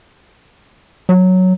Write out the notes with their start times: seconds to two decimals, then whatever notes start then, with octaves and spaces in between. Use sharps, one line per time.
1.09 F#3